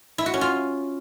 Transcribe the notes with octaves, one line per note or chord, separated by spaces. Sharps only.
E4
F#4
C#4
F4